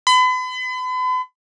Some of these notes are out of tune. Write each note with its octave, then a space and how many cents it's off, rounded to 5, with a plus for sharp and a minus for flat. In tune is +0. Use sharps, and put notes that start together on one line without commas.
B5 +40